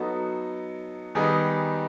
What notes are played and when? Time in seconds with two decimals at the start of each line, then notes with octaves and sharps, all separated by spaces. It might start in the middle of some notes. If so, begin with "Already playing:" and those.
Already playing: F#3 B3 D#4 F#4 A4
1.15 D#3 G3 B3 D#4 G#4